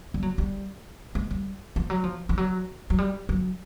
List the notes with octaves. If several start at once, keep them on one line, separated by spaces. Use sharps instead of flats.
G3
F#3
G3
G#3
G3
F3
F#3
F3
F3
F#3
F#3
G3
F#3